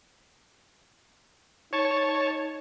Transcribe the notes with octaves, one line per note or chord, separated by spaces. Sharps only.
D#4 C#5 A5 C#6